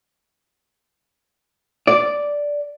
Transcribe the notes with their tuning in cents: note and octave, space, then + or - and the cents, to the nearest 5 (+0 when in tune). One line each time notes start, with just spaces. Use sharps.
D5 -5